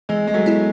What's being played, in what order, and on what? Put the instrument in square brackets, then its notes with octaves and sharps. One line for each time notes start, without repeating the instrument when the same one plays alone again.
[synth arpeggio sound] E3 [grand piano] G#3
[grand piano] G#3
F#3 A3
[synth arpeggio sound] B3 E4